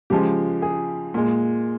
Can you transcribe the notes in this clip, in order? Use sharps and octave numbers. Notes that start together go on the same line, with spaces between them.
C#3 F3 G#3 G4
G#4
A#2 G#3